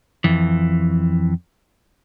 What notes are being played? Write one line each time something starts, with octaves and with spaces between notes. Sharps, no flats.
F2 E3